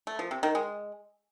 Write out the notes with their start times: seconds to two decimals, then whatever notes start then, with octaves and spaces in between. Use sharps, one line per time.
0.07 A3
0.19 F3
0.31 C3
0.43 D#3
0.55 G#3